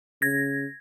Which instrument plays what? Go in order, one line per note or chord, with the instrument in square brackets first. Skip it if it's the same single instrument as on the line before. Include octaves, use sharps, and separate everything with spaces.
[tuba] C#3 [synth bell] G#6 A#6